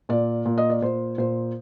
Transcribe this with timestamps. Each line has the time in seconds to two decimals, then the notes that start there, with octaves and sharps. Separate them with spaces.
0.09 A#2 D5
0.46 A#2
0.58 D#5
0.70 D5
0.82 A#2 C5
1.18 A#2 C5